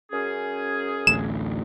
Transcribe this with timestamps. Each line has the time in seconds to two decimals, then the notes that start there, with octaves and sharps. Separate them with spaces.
0.11 F#2 C#4 G#4
1.07 A1 D2 E7